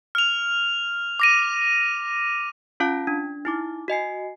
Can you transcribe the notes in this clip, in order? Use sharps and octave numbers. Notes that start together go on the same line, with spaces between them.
F6 F7
D6 A#6 D#7
C#4 F4 F5 A5
D4
D#4 E4 D6
F#4 D#5 G#5 C7